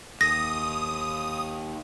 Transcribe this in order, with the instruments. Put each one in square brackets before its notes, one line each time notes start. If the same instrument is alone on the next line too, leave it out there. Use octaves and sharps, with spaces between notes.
[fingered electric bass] D#2 [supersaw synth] D#6 [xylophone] A#6